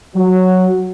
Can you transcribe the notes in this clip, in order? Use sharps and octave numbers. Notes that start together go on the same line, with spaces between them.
F#3